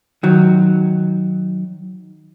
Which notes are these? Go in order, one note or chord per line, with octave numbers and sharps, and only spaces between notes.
D#3 F#3